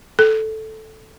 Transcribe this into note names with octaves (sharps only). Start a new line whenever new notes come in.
A4